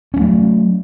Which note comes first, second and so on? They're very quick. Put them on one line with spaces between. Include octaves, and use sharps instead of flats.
C#4 G3 A3 F#3